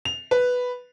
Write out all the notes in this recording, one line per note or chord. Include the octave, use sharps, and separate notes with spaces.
F7
B4